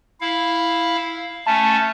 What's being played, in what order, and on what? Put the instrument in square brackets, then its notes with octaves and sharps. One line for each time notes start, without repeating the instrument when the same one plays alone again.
[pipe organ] E4 F5
[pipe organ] A3 C#4 [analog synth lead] A5